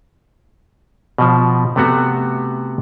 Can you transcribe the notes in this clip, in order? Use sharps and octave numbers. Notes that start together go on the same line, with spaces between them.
B2 F3
C3 A3 B3 F#4